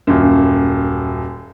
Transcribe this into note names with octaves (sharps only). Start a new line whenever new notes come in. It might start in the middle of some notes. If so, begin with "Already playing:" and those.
D#1 F#2